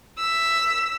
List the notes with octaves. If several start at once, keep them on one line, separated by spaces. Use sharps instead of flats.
E6 B6